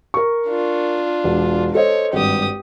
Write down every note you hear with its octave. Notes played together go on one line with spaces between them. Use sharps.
A#4 C#6
D4 F4
E1
A4 C5 C#5 D#5
G#1 G2 G4 D#6